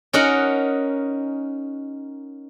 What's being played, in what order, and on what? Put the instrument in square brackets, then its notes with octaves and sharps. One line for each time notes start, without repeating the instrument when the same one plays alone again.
[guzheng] C#4 D#4 F#4 A#4 F#5